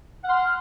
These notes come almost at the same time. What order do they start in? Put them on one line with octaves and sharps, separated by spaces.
F#5 F6 C6